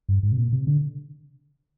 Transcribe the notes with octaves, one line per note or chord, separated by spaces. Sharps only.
G2
G#2
C3
A#2
C3
D3